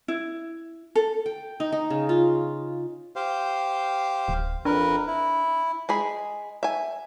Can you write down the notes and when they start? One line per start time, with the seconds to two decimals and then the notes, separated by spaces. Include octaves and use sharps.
0.08 E4
0.95 A4
1.26 G5
1.60 D#4
1.72 D#4
1.90 C#3
2.09 F4
3.16 G4 C5 F5
4.28 D1
4.65 F2 D4 A#4 B4
5.07 E4
5.89 G#3 G#4 B5
6.63 E5 G#5